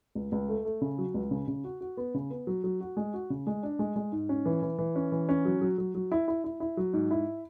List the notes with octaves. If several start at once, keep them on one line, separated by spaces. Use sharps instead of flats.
C#2
C#2
A3
A3
C#3
F#3
C#2
C#3
C#3
F#4
F#4
B3
C#3
B3
F#3
F#3
F#4
G#3
F#4
C#3
G#3
D4
G#3
G#3
G#2
C#4
E3
E3
E3
C#4
E3
C#4
F#3
F#3
F#3
F#3
E4
E4
E4
E4
F#3
G#2
E4